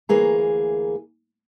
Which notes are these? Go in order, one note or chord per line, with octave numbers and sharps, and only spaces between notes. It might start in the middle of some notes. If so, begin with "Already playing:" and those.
D2 E3 A#3 G#4 A#5